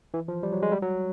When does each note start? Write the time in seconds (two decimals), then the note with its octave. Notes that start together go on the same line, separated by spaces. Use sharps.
0.14 E3
0.28 F3
0.43 G3
0.52 F#3
0.62 G#3
0.72 G3
0.82 F#3